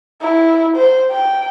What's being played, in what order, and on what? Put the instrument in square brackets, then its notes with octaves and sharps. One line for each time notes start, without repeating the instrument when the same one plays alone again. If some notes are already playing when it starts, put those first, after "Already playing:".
[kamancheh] E4
C5
G5